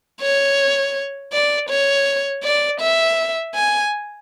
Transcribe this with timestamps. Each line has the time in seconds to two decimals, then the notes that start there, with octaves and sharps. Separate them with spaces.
0.22 C#5
1.33 D5
1.69 C#5
2.44 D5
2.81 E5
3.55 G#5